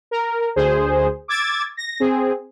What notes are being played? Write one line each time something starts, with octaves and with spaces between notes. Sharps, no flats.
A#4
D2 G#4 C5
D6 E6 G#6 A6
A#6
C4 G#4